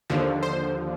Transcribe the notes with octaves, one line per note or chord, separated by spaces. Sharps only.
D#2 D3 F3
C5